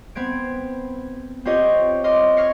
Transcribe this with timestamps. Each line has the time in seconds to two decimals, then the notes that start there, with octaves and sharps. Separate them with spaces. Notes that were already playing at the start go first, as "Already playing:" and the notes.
0.15 B3 C4 G#6 D7
1.45 C4 F4 G4 C#5 D#5
2.04 D#5 C6 D6 F6
2.37 C#6 F6 G#6 A#6 C7 C#7